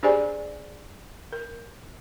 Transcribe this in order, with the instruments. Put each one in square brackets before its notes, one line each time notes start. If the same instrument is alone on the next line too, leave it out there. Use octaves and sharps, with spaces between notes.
[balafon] D4 G4 G#4 C5 D5 G#5
A#4